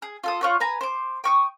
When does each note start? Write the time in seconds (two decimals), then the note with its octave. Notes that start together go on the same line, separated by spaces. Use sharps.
0.02 G#4
0.24 F4 A4 D#6
0.41 F4 C#5 F#5
0.60 B4 G#5 A#5
0.81 C5 D6
1.24 G5 C#6 D#6